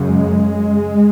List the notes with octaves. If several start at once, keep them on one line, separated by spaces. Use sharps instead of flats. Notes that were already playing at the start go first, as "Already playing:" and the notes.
Already playing: F#2 C#3
G#3